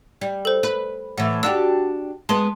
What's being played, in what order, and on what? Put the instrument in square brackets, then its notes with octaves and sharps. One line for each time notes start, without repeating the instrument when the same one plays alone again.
[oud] G3
[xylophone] A4 C5
[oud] B4
[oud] A2 E3 [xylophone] F#5
[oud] D4 F#4 G4 [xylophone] E6
[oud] G#3 B3 [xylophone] A5 C6